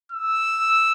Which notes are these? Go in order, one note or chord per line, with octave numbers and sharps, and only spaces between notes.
E6